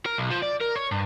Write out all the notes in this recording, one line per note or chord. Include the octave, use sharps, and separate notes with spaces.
A#4
B1
F3
D5
A#4
C#5
G2